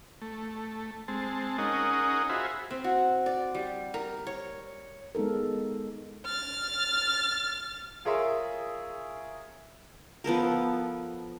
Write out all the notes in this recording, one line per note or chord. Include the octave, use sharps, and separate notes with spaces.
A3
G#3 C4 A5
C#4 D#4 G#4 A#4 D#5 F#5
F4 F#4 G#4 C5 E5 B5
C4
F#4
D5
G3
A#4
C#5
G#3 B3 D#4 A4 A#4
F6 A6
F4 G#4 A#4 C#5 E5 C6
F3 B3 A4 A#4